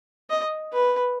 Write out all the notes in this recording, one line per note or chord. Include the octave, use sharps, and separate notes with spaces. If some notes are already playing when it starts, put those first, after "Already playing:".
D#5
B4